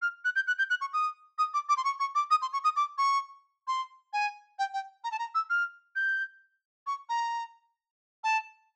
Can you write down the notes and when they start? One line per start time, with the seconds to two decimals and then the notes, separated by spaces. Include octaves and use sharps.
0.02 F6
0.25 F#6
0.36 G6
0.47 F#6
0.59 G6
0.70 F#6
0.81 C#6
0.93 D#6
1.38 D#6
1.54 D6
1.69 D6
1.77 C6
1.85 C#6
2.00 C#6
2.15 D6
2.31 D#6
2.42 C6
2.53 C#6
2.64 D#6
2.76 D6
2.98 C#6
3.68 C6
4.13 G#5
4.59 G5
4.74 G5
5.04 A#5
5.12 A5
5.19 A#5
5.35 E6
5.50 F6
5.96 G6
6.87 C#6
7.09 A#5
8.24 A5